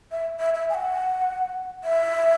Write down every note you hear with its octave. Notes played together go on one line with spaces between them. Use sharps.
E5
E5
E5
G#5
F#5
E5